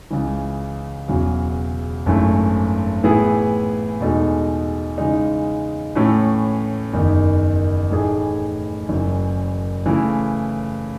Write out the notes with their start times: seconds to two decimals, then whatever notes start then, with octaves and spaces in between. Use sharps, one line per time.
0.11 C#2 C#3 E3
1.08 E1 E2 C#3 F#3
2.06 G#1 F#2 E3 A3
3.04 A2 E3 B3 E4 G#4
4.00 E2 B2 G#3 D#4 A4
4.98 C#3 E3 G#3 D#4
5.95 A2 E3 A3 C#4
6.93 F#1 E2 D#3
7.91 A2 E3 A3 D#4 G#4
8.89 F#1 F#2 E3
9.86 C#3 E3 A3 E4